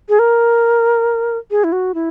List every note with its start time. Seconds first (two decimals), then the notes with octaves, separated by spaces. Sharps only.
0.09 G#4
0.19 A#4
1.51 G#4
1.64 E4
1.72 F#4
1.94 E4